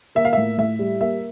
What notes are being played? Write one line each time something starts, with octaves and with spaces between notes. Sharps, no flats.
A#3 E5
F5
A2 E5
A2 E5
G3
A#3 E5